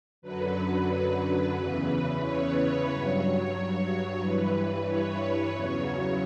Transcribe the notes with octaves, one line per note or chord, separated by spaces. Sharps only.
F#2 D3 F#3 B4
E2 C#3 E3 B4
C#5
G2 F#3
G2 E3 B4
C#5
E2 C#3 F#3